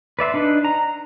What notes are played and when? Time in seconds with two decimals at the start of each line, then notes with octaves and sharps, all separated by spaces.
0.19 B4 D5 E5 C6
0.34 D4 D#4 B4
0.65 A#5